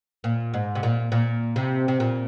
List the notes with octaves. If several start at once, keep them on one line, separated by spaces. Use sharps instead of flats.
A#2
G#2
C3
A#2
A#2
C3
C3
A#2